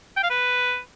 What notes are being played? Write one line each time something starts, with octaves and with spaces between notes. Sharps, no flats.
G5
F5
B4